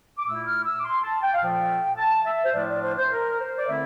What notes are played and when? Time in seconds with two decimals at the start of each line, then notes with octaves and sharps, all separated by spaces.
0.18 D6
0.28 A#2 A3 E4 E6
0.48 F6
0.66 E6
0.80 D6
0.85 C6
1.04 A5
1.23 G5
1.34 F5
1.41 A#2 F3 A3 G5
1.98 A5
2.26 E5
2.44 C5
2.55 A2 F3 A3 D4 F4 D5
2.69 D5
2.84 C5
2.98 C5
3.12 A#4
3.39 C5
3.58 D5
3.68 D3 A3 C4 E4 E5